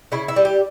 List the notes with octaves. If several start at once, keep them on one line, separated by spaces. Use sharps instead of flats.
C#3 E4
E4
G3
G4